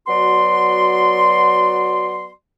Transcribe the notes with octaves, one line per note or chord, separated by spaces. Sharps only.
F#3 B3 F#4 D5 C6